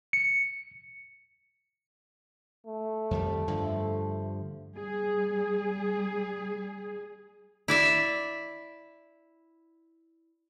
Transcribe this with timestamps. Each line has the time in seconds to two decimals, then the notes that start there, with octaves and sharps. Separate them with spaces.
0.13 C#7
2.66 A3
3.11 F2 D#3 G3
3.48 G2 D3 F3
4.74 G3 G#4
7.68 E4 D5 E5